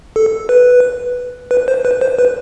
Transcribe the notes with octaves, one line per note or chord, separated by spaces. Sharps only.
A4
B4
B4
C5
B4
C5
B4